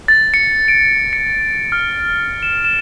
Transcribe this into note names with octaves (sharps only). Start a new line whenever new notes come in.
A6
C#7
D7
C#7
F6
E7
E7